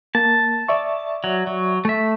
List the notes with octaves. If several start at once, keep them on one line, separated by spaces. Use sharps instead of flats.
A#3 A5
D5 E5 C#6
F#3
F#3
A3 E5